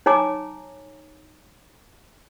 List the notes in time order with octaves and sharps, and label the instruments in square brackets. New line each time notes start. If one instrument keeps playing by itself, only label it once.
[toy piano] D#4 C#5 G#5 A#5 D6